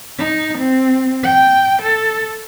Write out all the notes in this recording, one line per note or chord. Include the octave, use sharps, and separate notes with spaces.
D#4
C4
G5
A4